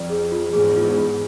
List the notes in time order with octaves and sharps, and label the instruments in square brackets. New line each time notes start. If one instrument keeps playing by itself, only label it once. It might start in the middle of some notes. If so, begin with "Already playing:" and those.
Already playing: [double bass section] F2 [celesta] D5
[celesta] G#4
F4
[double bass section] E2 G#2 [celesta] G#4
[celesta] F4
F4